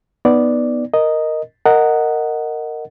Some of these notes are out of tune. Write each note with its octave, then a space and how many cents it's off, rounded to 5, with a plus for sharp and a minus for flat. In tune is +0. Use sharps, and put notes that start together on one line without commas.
B3 +0 D#4 +0 D5 +0
A#4 +0 D#5 +0
A#4 -10 D#5 +0 F#5 +0